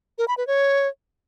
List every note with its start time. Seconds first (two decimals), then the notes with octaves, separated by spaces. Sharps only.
0.18 A#4
0.28 B5
0.38 B4
0.47 C#5